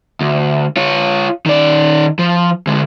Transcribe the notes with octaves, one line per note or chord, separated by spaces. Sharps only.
D2
F4 C#5
D#3 D5
F3
D3 G#3